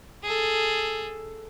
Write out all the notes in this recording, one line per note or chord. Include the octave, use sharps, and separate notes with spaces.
G#4 A4